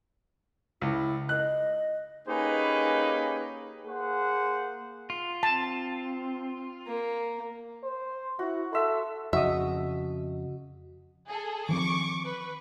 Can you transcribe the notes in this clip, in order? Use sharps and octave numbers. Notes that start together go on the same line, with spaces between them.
C#2 E4
D#5 F#6
A#3 C#4 D#4 G4 G#4 B4
A#3 G#4 C5 F#5
F4
C4 A5
A#3
C5
E4 F#4
A4 E5 C6
F2 C#3 F#4 D#5 E5
G#4 A4
D#3 F3 C4 C#6 D6
B4